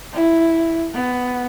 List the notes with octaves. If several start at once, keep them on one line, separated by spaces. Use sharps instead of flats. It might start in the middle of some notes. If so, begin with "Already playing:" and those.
E4
B3